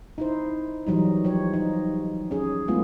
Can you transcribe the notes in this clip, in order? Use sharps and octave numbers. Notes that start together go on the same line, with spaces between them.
D#4 E4 C5
E3 F#3 G3 D#4
F3 G4 C#5
D#4
C#4 G#4
F#3 G#3 A3 B3 E4 F4